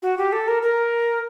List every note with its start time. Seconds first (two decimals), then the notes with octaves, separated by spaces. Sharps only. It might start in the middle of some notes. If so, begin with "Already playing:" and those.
0.02 F#4
0.18 G4
0.32 A4
0.48 A#4
0.62 A#4